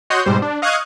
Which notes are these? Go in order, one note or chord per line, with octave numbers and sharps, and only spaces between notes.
F#4 C#5 D#5 F#5 C6 G6
G#2 B2 G3 C5
D4
D#5 F5 C#6 D#6 F#6 G#6